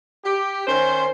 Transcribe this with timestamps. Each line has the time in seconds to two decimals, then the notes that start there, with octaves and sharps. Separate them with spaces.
0.25 G4
0.67 D#3 C#4 C5